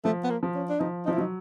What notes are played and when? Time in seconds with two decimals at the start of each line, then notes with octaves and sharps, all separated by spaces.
0.04 F3 A3
0.24 B3
0.30 A#3
0.43 F3
0.55 C#4
0.69 D4
0.80 F3 D#4
1.05 D#4
1.08 F3 E4
1.18 F#3 D#4